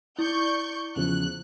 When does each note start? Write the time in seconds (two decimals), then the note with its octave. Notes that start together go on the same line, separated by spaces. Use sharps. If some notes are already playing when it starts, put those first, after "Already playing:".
0.19 E4 D5 C#6 G6
0.96 E2 C#3 F3 F#6